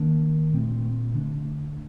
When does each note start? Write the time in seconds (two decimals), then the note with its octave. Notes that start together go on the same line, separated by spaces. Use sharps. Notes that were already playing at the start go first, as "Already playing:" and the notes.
Already playing: D#3 A#3 D4
0.53 A#2 A3 C4
1.14 D3 A3 D4